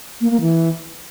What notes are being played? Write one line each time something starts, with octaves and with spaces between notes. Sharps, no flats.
A#3
A#3
E3